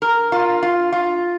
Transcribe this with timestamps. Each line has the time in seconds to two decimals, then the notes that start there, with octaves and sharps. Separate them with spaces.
0.02 A#4
0.32 F4
0.63 F4
0.92 F4